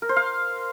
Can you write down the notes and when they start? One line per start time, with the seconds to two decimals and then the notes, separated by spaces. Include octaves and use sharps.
0.02 A#4
0.09 C5
0.16 F5